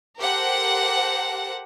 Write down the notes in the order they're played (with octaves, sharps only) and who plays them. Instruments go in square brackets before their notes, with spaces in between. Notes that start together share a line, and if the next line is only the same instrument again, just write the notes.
[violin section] G4 A4 A#4 C5 F#5